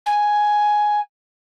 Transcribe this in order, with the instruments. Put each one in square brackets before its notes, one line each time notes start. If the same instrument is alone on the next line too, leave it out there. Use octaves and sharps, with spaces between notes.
[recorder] G#5